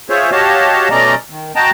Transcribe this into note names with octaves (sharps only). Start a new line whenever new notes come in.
F4 G#4 C5 C#5 E5
F#4 G4 C#5 D#5 F5 A5
B2 A3 C#4 D5 D#5 A#5
D#3
F#4 D#5 G5 A5 A#5